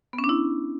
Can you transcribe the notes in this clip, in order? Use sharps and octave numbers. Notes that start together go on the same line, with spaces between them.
B3
C#4
D4
E4